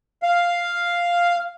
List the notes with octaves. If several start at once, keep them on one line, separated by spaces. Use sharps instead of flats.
F5